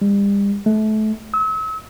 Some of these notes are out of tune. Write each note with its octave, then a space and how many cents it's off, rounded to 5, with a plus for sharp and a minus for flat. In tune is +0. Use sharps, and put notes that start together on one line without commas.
G3 +40
A3 -30
E6 -40